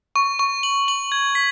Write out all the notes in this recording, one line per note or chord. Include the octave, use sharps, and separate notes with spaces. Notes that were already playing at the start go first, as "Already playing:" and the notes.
C#6
C#6
F#7
F#7
G#6
B6